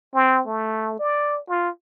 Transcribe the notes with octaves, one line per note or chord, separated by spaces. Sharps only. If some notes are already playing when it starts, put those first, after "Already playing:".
C4
A3
D5
F4